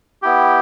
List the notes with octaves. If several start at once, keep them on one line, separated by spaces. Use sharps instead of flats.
B3 E4 G4 G5